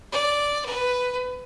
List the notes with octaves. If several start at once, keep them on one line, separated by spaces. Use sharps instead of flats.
D5
B4